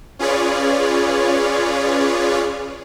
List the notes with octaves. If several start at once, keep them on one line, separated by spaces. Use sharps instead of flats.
C#4 F4 G#4 B4 C#5 D5